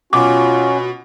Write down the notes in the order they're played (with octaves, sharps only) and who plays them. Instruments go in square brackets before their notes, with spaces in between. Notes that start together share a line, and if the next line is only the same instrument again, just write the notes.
[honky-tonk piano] B2 [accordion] C#4 F#4 [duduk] F4 [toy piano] D6